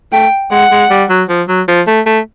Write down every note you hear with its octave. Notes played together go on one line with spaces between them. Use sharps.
A3 G5
G#3 F#5
G#3
G3
F#3
F3
F#3
F3
A3
A3